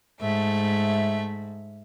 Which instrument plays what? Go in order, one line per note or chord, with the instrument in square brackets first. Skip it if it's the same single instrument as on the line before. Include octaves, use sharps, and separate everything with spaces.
[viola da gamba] G#2 [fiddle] A3 E5